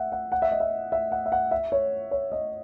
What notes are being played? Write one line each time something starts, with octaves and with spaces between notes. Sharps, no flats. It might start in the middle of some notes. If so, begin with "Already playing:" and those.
Already playing: E5 F#5
F#5
F#5
E5
D#5
E5
E5
F#5
E5
F#5
E5
C#5
C#5
D#5